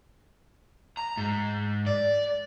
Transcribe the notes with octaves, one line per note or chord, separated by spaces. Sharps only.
A#5
G#2
D5